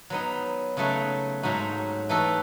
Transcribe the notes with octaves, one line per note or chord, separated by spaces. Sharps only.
F#3 B3 D#4
C#3 F#3 A3 D#4 F#4
G#2 F#3 A3 D#4 F#4
E3 A3 D#4 F#4 A4